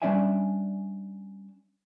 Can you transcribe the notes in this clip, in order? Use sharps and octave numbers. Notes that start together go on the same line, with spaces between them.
G3 C#4 D4 D5 E5 G#5